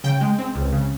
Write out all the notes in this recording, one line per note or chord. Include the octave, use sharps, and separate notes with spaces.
C#3 G5
G#3
C4
C#2
C#3